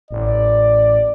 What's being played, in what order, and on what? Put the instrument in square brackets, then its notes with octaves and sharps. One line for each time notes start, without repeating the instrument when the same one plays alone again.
[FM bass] A1 [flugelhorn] D5